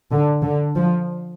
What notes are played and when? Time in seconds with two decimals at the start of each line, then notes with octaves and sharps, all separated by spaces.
0.12 D3
0.43 D3
0.76 F3